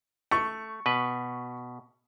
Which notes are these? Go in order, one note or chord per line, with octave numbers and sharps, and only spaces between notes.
A3 C#6
B2 B4